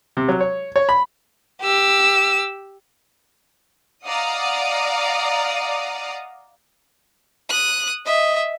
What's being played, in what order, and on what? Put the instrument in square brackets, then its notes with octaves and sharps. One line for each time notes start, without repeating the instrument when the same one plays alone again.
[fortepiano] C3
F#3
C#5
C#5
B5
[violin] G4 E6
[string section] D5 D#5 F5 F#5 A#5 D#6
[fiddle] D#6 F#6
[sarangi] D#5 [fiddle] E5